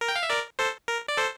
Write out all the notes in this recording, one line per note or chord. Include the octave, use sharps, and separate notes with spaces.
A#4
G5
F5
E5
A#4 D5
A4 C5
A#4
D5
A4 C5